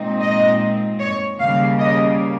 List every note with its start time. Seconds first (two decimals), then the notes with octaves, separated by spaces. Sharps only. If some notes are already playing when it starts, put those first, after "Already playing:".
Already playing: A#2 G#3 C4 D#4
0.21 D#5
0.99 C#5
1.39 D#2 C#3 G3 A#3 F5
1.78 D#5